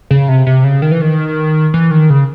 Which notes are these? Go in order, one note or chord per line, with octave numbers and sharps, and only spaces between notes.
C#3
C3
C3
C#3
D#3
E3
D#3
E3
D#3
C#3